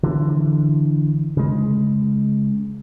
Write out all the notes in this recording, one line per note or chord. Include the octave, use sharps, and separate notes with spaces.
D3 E3
C#3 G#3